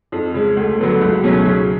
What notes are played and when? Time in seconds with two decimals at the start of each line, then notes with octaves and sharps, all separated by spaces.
0.12 F2
0.34 C#3 G#3
0.57 D2
0.79 D3 F#3 B3
1.01 C#2
1.24 B2 F#3 A3 C#4
1.45 C#3